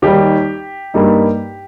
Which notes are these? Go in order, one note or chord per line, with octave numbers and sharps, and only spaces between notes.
D#2 D#3 G3 G4
G2 G3 A#3 D#4